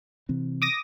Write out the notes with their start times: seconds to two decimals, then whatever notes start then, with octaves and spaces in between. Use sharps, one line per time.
0.29 C3 E3 C4
0.62 D6 D#6 A#6